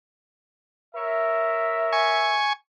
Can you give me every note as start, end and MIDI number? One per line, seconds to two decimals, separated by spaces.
0.95 2.49 70
0.95 2.49 73
0.95 2.49 76
1.93 2.53 80
1.93 2.53 85